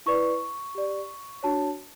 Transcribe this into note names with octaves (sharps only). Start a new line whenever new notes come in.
E4 B4 D5 C#6
G4 D5
D4 F#4 C#5 A5